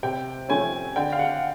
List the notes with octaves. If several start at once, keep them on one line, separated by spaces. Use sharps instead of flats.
C3 G5
F3 A3 C#4 G#5
D3 G5
F5
F#5